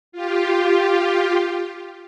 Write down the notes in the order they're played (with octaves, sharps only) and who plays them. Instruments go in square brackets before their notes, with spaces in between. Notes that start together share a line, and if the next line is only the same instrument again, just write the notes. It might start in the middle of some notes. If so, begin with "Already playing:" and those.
[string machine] F4 G4